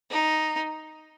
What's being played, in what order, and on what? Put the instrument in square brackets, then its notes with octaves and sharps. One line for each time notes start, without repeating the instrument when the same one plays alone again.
[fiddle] D#4